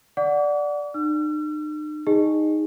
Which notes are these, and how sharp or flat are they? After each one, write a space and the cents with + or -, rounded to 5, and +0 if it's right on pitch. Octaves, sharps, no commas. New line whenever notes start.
D5 -5 F#5 -5 D6 -40
D#4 -45 E6 +45
D#4 +0 G#4 -15 D#5 -20